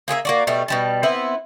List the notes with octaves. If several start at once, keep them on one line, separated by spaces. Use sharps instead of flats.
A#3 G#4 B4 E5
A#3 F#4 D5
B2 G3 A3
B2 G3 A5
B3 C4 E4